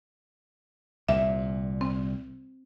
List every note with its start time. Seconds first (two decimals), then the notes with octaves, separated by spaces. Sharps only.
1.09 C2 A#2 E5
1.81 C4